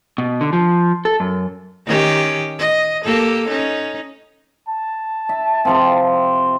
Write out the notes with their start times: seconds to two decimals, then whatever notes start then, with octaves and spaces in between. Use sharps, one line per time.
0.18 B2
0.41 D3
0.53 F3
1.05 A4
1.20 F#2
1.86 D#3 C#4 G4
2.59 D#5
3.04 A#3 G4 A4
3.48 C#4 D#4
4.69 A5
5.29 E5
5.65 C3 F3 C4